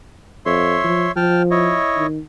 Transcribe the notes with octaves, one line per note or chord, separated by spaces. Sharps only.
F2 C#5 E5 C6
F3
F3 G5 A5 F6
E4 C#5 D#5
D#3